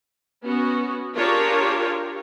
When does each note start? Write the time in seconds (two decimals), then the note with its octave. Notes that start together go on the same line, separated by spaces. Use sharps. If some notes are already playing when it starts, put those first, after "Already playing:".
0.45 B3 C#4 F#4
1.16 D4 F4 G4 G#4 A#4 C#5